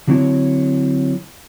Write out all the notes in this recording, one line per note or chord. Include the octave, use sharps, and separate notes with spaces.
D3 F#3 C4 D#4 E4 C#5